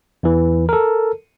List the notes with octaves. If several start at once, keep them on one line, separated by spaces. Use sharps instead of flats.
E2 E3
A4 A#4